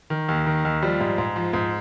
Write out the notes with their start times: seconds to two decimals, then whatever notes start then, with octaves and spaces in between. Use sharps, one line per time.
0.10 D#3
0.29 D#2
0.46 D#3
0.65 D#2
0.82 F3 G3
1.00 G#2
1.18 G#2
1.36 F3
1.53 G#2